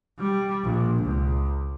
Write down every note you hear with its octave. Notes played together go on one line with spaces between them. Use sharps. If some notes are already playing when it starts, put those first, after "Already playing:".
G3
A#1
C#2